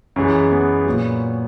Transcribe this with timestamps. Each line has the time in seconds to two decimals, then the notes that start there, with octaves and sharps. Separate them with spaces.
0.16 F#2 E3 G#3
0.51 B3
0.86 A#2 F#3